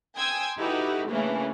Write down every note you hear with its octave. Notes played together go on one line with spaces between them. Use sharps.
G5 G#5 C6 D#6 E6 G#6
D#4 E4 F#4 G4 A4 B4
C#3 E3 A3 A#3 C#4 D4